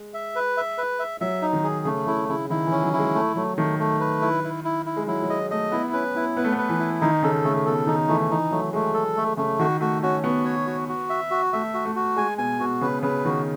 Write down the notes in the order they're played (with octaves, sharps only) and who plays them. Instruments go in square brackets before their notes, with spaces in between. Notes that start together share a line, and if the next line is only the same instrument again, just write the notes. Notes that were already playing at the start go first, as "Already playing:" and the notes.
Already playing: [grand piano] G#3
[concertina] E5
B4
E5
B4
E5
[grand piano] F#3 [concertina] E5
[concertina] D#4
[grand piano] D#3
[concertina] G#4
[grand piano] C#3 [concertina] A3
[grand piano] C#3 [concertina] E4
[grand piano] C#3 [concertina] E4
[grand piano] D#3 [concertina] E4
[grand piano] E3 [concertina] C#4
[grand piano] F#3
[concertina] E4
[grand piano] G#3
[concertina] A3
[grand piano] F#3 [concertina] A3
[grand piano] D#3 [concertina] A3
[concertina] A3
B4
E4
E4
E4
E4
[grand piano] G#3
[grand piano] F#3 [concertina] E4
[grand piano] F#3
[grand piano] G#3 [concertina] D#5
[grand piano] A3 [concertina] D#5
[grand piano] B3 [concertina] E4
[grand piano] C#4 [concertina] B4
[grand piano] B3 [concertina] E4
[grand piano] B3 [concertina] B4
[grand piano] A3
B3
[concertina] B4
[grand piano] E3
[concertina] E4
[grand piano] D#3 [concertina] D#4
[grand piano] C#3 [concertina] A4
[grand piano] C#3 [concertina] A3
[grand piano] B2 [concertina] A4
[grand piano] D#3 [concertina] D#4
[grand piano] E3 [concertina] A3
[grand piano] E3 [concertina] D#4
[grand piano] F#3 [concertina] A3
[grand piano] G#3 [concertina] A3
[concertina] A4
A3
[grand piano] C#3 [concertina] A3
[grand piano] D#3 [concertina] F#4
[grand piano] A3 [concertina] F#4
[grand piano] C#4 [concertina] F#4
[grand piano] B3 [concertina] F#4
[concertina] C#5
F#4
F#4
E5
F#4
[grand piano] A3 [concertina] E5
[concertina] F#4
[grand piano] A3
[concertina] F#4
[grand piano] G#3 [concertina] G#5
[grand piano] B2 [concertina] G#5
[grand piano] B2 [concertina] F#4
[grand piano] C#3 [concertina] B4
[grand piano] C#3 [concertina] B4
[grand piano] D#3 [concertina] F#4